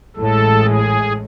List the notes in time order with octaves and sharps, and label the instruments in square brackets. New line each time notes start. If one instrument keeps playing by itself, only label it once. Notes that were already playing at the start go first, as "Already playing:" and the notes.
[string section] A1 A2 G#3 [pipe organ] A4
[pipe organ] G#4